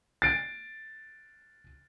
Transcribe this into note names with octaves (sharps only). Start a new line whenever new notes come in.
A6 C7 D7